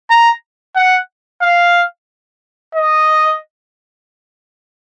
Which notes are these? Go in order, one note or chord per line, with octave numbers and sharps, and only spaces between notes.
A#5
F#5
F5
D#5